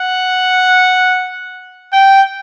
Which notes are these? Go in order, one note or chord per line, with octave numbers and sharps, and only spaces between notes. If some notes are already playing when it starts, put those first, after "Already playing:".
Already playing: F#5
G5